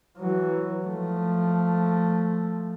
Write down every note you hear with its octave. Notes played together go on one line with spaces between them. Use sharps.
E3 F#3
F3 A3